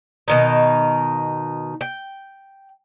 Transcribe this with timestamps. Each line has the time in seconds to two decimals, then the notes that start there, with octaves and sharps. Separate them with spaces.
0.28 B2 D#3 D#4
1.81 G5